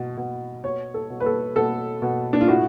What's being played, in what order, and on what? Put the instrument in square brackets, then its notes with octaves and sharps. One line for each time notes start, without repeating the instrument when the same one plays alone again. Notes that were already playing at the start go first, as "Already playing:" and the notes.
Already playing: [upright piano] B2
B2
B2 C#5
A4
B2
B4
A4
B2 A4
B2
D4
F4
A2 F#4